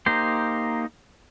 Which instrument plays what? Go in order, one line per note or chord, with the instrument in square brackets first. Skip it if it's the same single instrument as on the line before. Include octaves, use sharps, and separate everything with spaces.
[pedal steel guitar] A#3 D#4 G4 C5